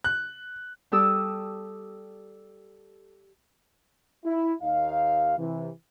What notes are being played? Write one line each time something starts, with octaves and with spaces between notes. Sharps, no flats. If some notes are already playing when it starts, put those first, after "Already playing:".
F#6
G3 G4 A4 D#6 E6
E4
D#2 D#4 F5
C3 E3